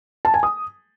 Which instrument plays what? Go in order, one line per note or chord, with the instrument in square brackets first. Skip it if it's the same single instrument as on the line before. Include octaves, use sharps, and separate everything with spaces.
[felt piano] A5
G#5
D#6